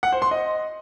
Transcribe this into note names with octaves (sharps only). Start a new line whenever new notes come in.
F#5
C5
C6
D#5